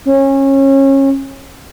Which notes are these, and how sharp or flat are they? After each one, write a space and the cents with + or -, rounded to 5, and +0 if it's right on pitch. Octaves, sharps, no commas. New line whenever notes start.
C#4 -25